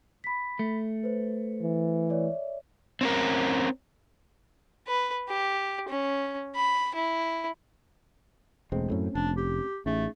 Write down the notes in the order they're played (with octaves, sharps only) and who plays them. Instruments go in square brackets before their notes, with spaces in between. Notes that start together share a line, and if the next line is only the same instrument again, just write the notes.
[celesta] B5 B6
[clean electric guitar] A3
[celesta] B4 C5
[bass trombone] E3
[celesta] C#5 D5 E5
[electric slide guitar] C4 C#4 A#4
[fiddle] B4
G4
C#4
B5
E4
[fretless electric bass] E1 G#3 C4 [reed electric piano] C#2 B2 A3
[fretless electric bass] F#2 A2 [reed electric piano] A3 C4 C#4
[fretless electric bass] F1 [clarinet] D4
[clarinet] G4
[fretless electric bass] A1 [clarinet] A3 [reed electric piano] C#4 D#4 G#4